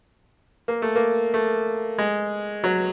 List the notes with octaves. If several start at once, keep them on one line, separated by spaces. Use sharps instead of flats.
A#3
A3
A#3
A3
G#3
F#3